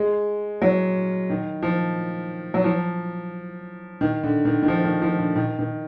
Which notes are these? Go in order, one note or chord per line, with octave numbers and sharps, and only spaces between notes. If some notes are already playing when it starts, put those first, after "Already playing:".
Already playing: G#3
F#3
D#3
F3
F#3
F3
D#3
D3
D#3
D#3
F3
D#3
F3
D3
D#3
D#3